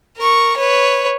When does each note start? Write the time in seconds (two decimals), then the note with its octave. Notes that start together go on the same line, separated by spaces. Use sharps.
0.17 A#4 C#6
0.57 B4 C#5